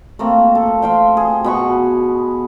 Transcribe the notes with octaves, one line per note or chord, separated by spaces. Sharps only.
A3 A#3 C4
A4
C5 F5 G5
G#4
B2 B3 C#6